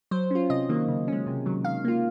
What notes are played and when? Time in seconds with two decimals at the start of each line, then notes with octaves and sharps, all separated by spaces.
0.11 F#3 C5
0.31 C#4 F4
0.50 C3 D#5
0.69 D#3 F#3 A#3
0.88 C#3
1.08 G#3 C#4
1.26 C3
1.46 D#3 F#3
1.65 D#3 F5
1.85 A#3 F4